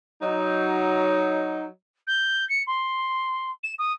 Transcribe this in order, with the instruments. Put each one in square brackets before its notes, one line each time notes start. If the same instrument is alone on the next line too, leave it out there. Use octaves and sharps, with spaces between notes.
[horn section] F#3 D#4
[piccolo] G6
C#7
C6
E7
D#6